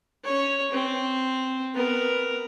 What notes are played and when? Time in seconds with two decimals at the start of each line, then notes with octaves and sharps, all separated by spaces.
0.24 C#4 C#5
0.71 C4
1.74 B3 A#4